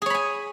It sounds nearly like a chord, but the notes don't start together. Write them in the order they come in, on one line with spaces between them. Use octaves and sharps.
G#4 C#5 B5 G#5